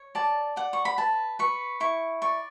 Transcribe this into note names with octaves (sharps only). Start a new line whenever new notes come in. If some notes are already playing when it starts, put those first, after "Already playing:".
Already playing: C#5
D5 A5
D5 F#5
C#6
B5
B4 A5
B4 C#6
E4 C#6
D5 C#6